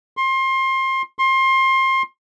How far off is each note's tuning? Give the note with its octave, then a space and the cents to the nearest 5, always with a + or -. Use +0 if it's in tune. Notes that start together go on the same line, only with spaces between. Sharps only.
C6 +25
C6 +25